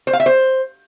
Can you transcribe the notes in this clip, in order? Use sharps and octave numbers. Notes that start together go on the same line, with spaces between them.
C5
F5
E5
C5